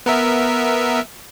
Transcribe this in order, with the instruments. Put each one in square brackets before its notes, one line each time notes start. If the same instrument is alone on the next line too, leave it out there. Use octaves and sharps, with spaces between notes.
[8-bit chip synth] B3 A#4 E5